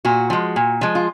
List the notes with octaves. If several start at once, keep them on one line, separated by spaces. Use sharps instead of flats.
A#2 F#4
F3 G#3
A#2
F3 G#3
F4